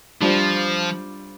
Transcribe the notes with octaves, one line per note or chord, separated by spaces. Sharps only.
F3 G3 D4 F4 C5